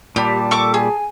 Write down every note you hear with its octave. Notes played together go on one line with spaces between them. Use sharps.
A#2 G3 G4 A5
A4 C#6 D6
G#4 G#5